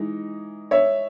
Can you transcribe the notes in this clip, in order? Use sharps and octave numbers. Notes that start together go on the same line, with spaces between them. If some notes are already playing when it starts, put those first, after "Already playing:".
Already playing: E3 G#3 D#4
C#5 E5